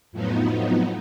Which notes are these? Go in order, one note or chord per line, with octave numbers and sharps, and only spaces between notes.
F2 A2 F3 F#3 B3 D#4